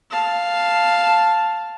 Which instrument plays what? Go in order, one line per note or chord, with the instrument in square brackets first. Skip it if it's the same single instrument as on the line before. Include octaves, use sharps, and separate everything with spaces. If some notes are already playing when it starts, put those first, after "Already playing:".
[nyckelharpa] F5 A5